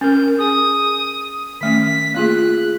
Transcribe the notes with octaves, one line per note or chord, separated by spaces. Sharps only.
C#4 A#4 G6
G#4 G#5 D#6
D#3 A3 C#4 B6
A#3 F4 G#4 F#6